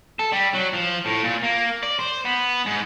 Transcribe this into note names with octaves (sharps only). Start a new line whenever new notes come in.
A4
G3
F#3
F3
A2
A#2
A#3
D5
C5
B3
G#2